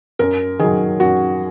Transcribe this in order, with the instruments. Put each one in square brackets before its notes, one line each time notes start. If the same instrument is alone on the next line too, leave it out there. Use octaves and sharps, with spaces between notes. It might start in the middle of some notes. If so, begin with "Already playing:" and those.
[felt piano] F#2 A#4
D#3 F#3 G#4
F#2 F#4